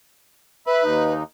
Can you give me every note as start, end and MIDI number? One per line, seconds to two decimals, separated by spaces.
0.67 1.12 71
0.67 0.83 76
0.67 0.83 83
0.83 1.23 39
0.83 1.23 63